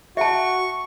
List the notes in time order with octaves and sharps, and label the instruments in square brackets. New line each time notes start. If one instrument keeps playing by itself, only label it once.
[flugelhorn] F#4 [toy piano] E5 A5 [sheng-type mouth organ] C#6